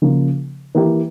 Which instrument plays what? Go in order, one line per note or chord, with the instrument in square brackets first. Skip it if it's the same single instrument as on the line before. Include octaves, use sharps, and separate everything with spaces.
[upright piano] C#3 F3 A#3 F4
E3 A#3 E4 G4